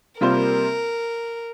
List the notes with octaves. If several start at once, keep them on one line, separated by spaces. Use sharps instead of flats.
C3 G3 A#3 F4 A#4 C5